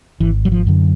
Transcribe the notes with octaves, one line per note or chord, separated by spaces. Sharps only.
G#1 E3
F#3
F3
F#2 D3